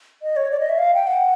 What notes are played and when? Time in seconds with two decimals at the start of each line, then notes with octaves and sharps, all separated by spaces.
0.22 D#5
0.36 C#5
0.51 D5
0.60 D#5
0.69 E5
0.78 F5
0.94 G5
1.07 F#5